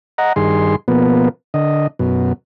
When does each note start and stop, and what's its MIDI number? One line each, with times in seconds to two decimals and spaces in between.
0.18 0.33 75
0.18 0.33 78
0.18 0.33 82
0.36 0.76 43
0.36 0.76 51
0.36 0.76 68
0.36 0.76 84
0.88 1.29 47
0.88 1.29 53
0.88 1.29 58
0.88 1.29 59
1.54 1.87 50
1.54 1.87 75
1.99 2.33 42
1.99 2.33 47